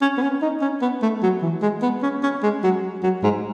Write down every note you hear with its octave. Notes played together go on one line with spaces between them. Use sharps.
C#4
B3
C#4
D#4
C#4
B3
A3
F#3
E3
G#3
B3
C#4
C#4
G#3
F#3
F#3
G#2